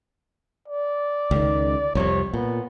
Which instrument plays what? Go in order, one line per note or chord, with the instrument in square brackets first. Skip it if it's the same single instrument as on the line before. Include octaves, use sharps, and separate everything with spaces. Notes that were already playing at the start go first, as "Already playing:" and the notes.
[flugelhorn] D5
[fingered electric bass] C#2 D#3
[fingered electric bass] C2 F2 C3 [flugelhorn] C#5
[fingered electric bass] A#2 [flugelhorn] B3